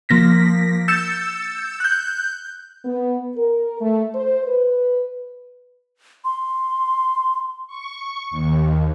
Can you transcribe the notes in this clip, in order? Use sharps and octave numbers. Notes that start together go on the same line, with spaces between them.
F3 A#3 A#6 B6
E6 G6 A6 C#7 E7
F#6 G6
B3
A#4
A3
C5
B4
C6
C#6
D#2